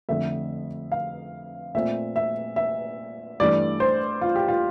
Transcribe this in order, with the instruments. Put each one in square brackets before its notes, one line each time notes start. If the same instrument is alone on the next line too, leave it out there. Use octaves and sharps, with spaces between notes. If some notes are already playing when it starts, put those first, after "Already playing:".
[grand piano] F2 D3 A3 E5
F5
A#2 A3 C4 E5
E5
E5
G2 E3 A3 D5
C5
F4
G4
F4